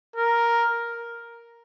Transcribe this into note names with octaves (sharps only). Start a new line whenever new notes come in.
A#4